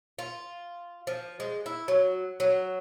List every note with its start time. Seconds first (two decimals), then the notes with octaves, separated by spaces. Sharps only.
0.19 F4
1.07 F3
1.40 G#3
1.66 E4
1.88 F#3
2.40 F#3